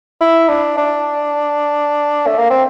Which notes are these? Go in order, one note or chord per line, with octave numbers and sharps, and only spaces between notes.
E4
D4
D4
A3
A#3
C4